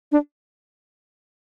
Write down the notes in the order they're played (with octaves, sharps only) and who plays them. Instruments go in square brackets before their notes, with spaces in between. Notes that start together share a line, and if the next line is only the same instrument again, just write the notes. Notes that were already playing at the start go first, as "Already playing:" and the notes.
[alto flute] D4